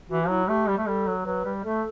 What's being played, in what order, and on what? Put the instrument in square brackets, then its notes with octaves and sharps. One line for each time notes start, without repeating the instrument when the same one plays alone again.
[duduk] E3 [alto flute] F#4
[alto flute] F#4
[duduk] F#3 [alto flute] E4
[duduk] A3 [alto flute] G4
[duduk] G3
A3
[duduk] G3 [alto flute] A4
[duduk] F#3
[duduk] F#3 [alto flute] B4
[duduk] G3
[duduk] A3 [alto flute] A4